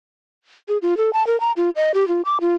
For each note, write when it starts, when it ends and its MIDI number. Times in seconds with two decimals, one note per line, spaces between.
0.68 0.78 68
0.82 0.97 65
0.97 1.13 69
1.13 1.25 81
1.27 1.39 70
1.40 1.52 82
1.57 1.70 65
1.76 1.92 75
1.94 2.07 67
2.08 2.22 65
2.25 2.38 86
2.41 2.55 65